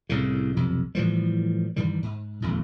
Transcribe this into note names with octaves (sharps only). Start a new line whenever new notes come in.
C2 A2 C#3
B1 F2 C3
A2 E3 F3 G3
G2 D#3 E3 G3
G#2
D#1 G#1 F2 G#2